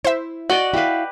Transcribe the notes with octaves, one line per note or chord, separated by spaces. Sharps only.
E4 C5 E5
F#4 D5 D#5 F#5
E4 G4 B4 F5